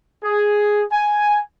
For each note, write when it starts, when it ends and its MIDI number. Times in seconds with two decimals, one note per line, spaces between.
0.24 0.82 68
0.92 1.40 80